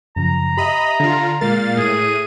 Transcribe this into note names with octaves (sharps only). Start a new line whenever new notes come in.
F#2 C#3 F3 A#5
G4 D#5 E5 B5
D3 F4
A#2 G#3 A#4 F5 A6
A2 G#4 D#7